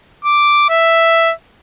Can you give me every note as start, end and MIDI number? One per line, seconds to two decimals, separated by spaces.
0.25 0.66 86
0.69 1.33 76